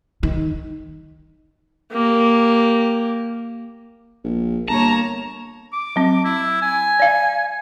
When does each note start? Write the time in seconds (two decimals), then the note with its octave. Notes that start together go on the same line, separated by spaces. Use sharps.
0.23 D#3
1.92 A#3 G4
4.24 A#1
4.68 G1 A#3 C#5 A5 A#5
5.73 D6
5.96 F#3 C4
6.24 E4
6.62 G#5
6.99 D5 F5